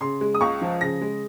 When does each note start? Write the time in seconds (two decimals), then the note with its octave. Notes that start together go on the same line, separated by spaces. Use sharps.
0.01 C#3 C6
0.21 G#3
0.34 D#6
0.41 C#2 C#6
0.61 F3
0.81 C#3 A#6
1.01 G#3